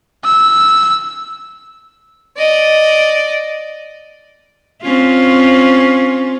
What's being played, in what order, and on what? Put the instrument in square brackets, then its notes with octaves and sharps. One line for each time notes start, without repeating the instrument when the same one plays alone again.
[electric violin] E6
[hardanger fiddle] D5 D#5
[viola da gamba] C4 C#4 F4